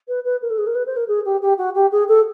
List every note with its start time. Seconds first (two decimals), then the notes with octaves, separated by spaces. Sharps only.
0.08 B4
0.25 B4
0.42 A#4
0.50 A4
0.58 G#4
0.67 A#4
0.75 B4
0.86 C5
0.97 A#4
1.08 G#4
1.25 G4
1.42 G4
1.58 F#4
1.75 G4
1.92 G#4
2.08 A4